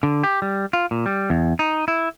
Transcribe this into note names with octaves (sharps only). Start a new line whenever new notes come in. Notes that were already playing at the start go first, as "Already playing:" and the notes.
D3
G4
G3
F4
A#2
G3
E2
D#4
E4